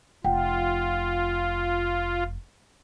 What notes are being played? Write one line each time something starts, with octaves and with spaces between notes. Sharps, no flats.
F1 F4 F#5 G5